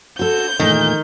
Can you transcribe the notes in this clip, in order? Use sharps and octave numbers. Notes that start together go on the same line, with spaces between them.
F#4 A4 G6
E2 A#2 D#3 A3